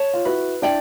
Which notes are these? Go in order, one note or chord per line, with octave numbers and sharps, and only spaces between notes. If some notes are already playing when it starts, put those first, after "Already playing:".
Already playing: C#5 A5
F4
E4 F#4 B4
D4 E4 D5 G5